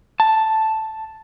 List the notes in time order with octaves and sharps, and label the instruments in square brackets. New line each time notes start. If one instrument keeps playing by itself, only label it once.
[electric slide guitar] A5